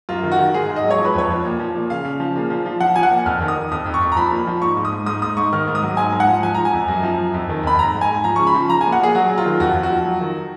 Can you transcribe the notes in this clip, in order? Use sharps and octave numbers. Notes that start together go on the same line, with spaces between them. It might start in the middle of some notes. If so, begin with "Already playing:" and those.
F#2 F4
D#3
F#4
D#3
G#2 G#4
G#2
D#5
F#3
C#5
F3
B4
F2 C#5
F3
A#2
F3
A#2
C#3 F5
C#3
F3
A#2
F3
F3
F3 F#5
F3 G#5
F#5
A#2
F2 F6
D#3
D#6
D#3
F2 D#6
F2
C#6
F2
A#5
F3 B5
A#2
F3
G#2 C#6
G#2
D#6
G#2
G#2 D#6
G#2 D#6
G#2 C#6
D#3 F6
G#2
D#6
F#3
G#2 G#5
G#2
F#5
F3
F3 G#5
F3 A#5
G#5
F2
F#2
F3
F#2
F2
D#3
F2 B5
G#2 A#5
G#2
G#5
G#2
F3 A#5
C#3 C#6
B5
F3
F3 A#5
A#2 G#5
F#5
A#2 G#4
F#3 F#4
F#3
F4
D#3
F2 F#4
F3
F#4
F3
F#3
D#3